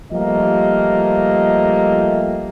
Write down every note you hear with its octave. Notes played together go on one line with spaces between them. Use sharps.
F3 G3 A3 A#3 G4 D#5